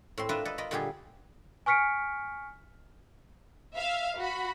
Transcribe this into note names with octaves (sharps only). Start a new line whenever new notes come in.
A2 C4 C6
D4 F4 A#4 B4 E5
A4 B4 D5 D#5
F4 A#4 D#5 B5
A#2 D3 G3 F4 G4 G#4
G#5 C#6 F6 B6 C#7 D7
E5 F5
F#4 B5